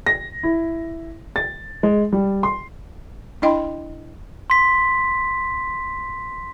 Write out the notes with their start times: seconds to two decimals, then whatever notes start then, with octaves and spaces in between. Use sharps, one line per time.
0.06 A#6
0.43 E4
1.36 A6
1.83 G#3
2.13 G3
2.43 C6
3.42 D4 E4 D#5 G5 B5 C6
4.50 C6 B6